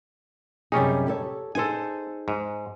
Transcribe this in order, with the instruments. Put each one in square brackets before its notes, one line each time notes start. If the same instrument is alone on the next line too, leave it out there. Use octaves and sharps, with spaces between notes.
[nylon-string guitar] F#2 C3 G#4 [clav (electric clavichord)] G3 C#4 D#4
[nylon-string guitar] G4 A4 C#5
[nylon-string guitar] D#4 G#4 C5 [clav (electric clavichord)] A4 G#5
[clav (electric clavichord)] G#2